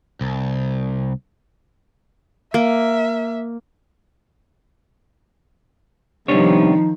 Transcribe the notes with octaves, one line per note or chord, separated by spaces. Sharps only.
C2
A#3 E5
C3 D#3 F3 G3 B3 D4 D#4 C#5